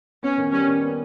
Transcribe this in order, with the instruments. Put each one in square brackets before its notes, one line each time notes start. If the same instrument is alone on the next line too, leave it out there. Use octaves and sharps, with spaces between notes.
[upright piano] B3 [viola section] C#4
[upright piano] D#3
[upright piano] G3 [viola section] C#4
[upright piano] D#3
B3